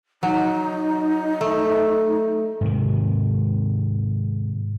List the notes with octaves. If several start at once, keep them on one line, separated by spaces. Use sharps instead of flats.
F#3 D#4
A3
G#2 C3 D#3